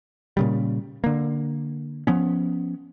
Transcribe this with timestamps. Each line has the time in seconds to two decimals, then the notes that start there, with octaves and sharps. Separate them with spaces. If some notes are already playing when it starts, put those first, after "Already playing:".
0.37 A#2 C#3 G3
1.04 D3 A#3
2.07 F3 B3 C#4